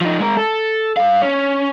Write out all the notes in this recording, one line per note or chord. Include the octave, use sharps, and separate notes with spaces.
F3 D#4
G#3 A#4
A4
G2 F5
C#4